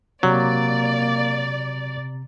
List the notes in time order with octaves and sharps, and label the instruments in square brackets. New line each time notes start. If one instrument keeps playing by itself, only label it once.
[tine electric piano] C3 A#5 [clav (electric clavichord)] F#3 [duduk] A#3 [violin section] D5